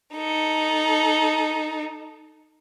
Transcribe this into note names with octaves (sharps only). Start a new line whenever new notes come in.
D#4 A4